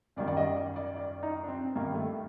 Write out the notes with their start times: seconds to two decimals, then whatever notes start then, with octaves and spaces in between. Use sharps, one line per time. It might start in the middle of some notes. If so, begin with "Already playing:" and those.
0.16 F#2 D#3 G3 D5
0.28 D5
0.37 D#5
0.56 D5
0.76 D5
0.96 D5
1.23 D#4
1.44 D4
1.48 C4
1.75 G2 D#3 G3 A#3
1.94 A3